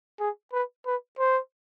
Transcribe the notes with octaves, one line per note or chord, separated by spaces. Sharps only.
G#4
B4
B4
C5